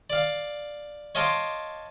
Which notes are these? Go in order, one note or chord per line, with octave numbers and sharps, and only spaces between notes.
D5 F5
C#5 D#5 F5 A5 C6 D6